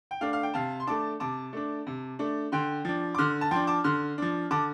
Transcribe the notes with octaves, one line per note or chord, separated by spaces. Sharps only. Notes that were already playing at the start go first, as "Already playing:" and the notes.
G5
A3 D4 F5
F5
G5
C3 F5 A5
C6
A3 D4 A5 D6
C3 A5 D6
A3 D4
C3
A3 D4
D3 G5 C6
F3 D4
D6
D3 C6 F6
A5
F3 D4 G5 C6
A5 D6
D3 C6 F6
F3 D4
D3 A5 D6